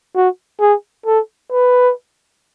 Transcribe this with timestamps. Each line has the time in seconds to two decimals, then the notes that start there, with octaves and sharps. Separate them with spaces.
0.15 F#4
0.60 G#4
1.06 A4
1.51 B4